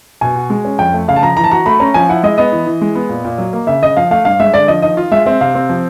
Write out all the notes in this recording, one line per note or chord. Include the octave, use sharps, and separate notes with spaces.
B2 G#5
F#4
G#3
C#4
F2 G5
A3
C#3 F5
A5
F3 A#5
E3 A#5
A5
F#4 A#5
A3 B5
C#4 A#5
F3 G#5
E4 F#5
G#3 D#5
B3 D#5
E3
E3
G#3
B3
A#2
A#2
F#3
A#3
C#3 E5
C#3 D#5
F3 F5
A3 F5
G2 F5
G#3 E5
D3 D5
F3 D#5
D#3 D#5
F4
G#3 E5
C4 E5
C3 F5
C4
F3